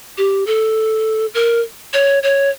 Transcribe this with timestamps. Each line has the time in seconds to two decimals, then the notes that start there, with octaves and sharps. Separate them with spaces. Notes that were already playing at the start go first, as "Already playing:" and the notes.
0.18 G4
0.47 A4
1.34 A#4
1.93 C#5
2.23 C#5